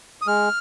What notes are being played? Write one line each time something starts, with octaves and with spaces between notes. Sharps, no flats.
D#6
G#3 F6